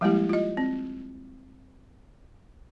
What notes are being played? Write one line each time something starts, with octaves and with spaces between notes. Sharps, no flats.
F3 G3 G#3 A#3 E4 G4
F4 D#5
C4